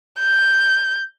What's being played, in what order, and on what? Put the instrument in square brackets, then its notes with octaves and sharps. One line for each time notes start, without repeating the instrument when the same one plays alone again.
[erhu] G6